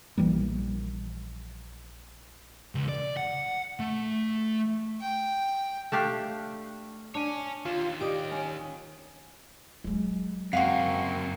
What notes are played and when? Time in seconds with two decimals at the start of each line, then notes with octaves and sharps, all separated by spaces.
0.18 A#1 E3 G3 A#3
2.75 C#2
2.89 D5
3.17 F#5
3.80 A3
5.01 G5
5.92 A3 D4 G4 F5
7.15 D4 C#5 G#5
7.65 D#2 F4
8.01 G4 D5 D#5 D7
8.31 C#4
9.84 F#3 G#3
10.53 F#2 A#3 C4 F5 F#5 C#6